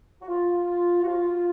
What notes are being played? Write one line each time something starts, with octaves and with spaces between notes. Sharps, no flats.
F#4
F4
F#4
F4